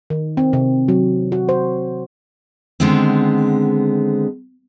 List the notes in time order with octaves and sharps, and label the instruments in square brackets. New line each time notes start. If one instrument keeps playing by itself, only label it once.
[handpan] D#3
C4
C3
F#3
F#4
C5
[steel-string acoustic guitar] D3 D#3 G#3 B3 C4